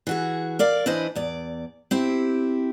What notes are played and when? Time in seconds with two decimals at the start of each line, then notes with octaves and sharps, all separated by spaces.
0.07 E3 F#4 G#4
0.59 A#4 D5 F5
0.86 E3 D4 E4 C5 D#5
1.16 E2 D5
1.91 C4 E4 G4